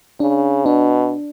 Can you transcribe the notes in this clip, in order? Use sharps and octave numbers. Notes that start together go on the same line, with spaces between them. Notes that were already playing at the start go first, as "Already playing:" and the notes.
C#3 D4
B2 D4